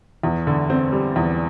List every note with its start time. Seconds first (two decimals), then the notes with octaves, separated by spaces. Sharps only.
0.23 E2
0.47 D3
0.70 C4
0.92 G3
1.16 E2